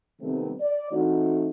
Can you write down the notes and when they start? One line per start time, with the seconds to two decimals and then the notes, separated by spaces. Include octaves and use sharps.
0.21 C3 D#3 G3 A3 B3 C4
0.60 D5
0.91 E3 A3 C4 D#4 F#4